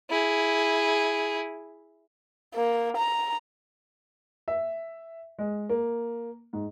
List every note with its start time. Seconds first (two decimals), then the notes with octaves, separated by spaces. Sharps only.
0.10 E4 G#4
2.54 A#3
2.97 A#5
4.48 E5
5.39 G#3
5.69 A#3
6.53 G#2